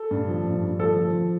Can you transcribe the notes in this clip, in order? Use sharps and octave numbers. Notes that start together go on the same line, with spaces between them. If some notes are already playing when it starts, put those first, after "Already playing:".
Already playing: A4
G2
F3
G2
G2
F3 A4
F3
F3